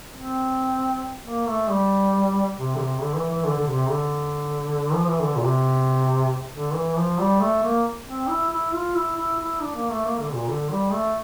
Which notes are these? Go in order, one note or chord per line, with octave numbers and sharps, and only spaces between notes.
C4
A#3
A3
G3
C3
D3
C3
D3
E3
E3
D3
D3
C3
D3
F3
E3
D3
A#2
C3
D3
E3
F3
G3
A3
A#3
C4
E4
E4
F4
E4
E4
E4
D4
A#3
A3
A#3
D3
A#2
D3
G3
A3